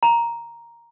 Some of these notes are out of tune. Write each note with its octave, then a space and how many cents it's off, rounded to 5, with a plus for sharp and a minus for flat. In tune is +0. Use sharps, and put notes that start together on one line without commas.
A#5 +5